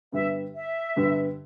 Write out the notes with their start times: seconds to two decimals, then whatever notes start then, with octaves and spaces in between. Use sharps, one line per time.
0.12 G2 D3 G3 B3 E5
0.55 E5
0.96 G2 D3 G3 B3